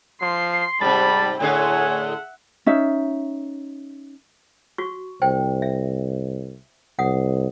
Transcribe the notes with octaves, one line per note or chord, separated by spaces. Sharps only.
F3 C6 C7
G#2 C3 G3 A5 B5
A2 D3 G#4 C#5 E5 F#5 G#5
C#4 D#4 E5
F#4 C#6
C2 C5 G5
E5
C2 F#5 D#6